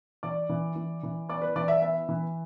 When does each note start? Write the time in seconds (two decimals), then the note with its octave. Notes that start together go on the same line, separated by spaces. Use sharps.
0.23 E3 D5
0.49 E3
0.76 E3
1.03 E3
1.29 B3 D5
1.42 B4
1.56 E3 D5
1.68 E5
1.82 B3 E5
2.09 E3